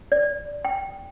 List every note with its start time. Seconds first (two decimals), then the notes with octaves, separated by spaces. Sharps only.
0.12 D5
0.65 G5